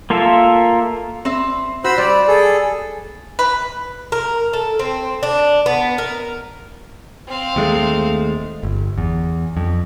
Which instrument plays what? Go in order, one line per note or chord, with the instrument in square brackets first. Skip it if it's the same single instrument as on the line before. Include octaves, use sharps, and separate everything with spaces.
[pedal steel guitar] A#3 F4 A4 A#4 E5
[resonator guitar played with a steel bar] C4 C5 E5
[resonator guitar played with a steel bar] F#4 [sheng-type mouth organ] C5 B5 E6
[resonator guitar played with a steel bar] G3 [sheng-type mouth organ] D5
[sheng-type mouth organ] G#4 A4
[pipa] B4
[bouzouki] A#4
A4
C4
D4
B3
A#4
[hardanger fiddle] C4 F5
[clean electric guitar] D#2 G#3 A3
[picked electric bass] G1
E2
F2